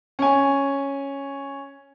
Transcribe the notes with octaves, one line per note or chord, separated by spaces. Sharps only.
C#4 G#5